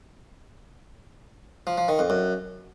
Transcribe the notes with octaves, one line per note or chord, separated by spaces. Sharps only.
F3
F3
D#3
F2
F#2